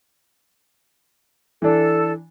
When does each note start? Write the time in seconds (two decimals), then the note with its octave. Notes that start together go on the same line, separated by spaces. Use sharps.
1.62 E3 D4 A4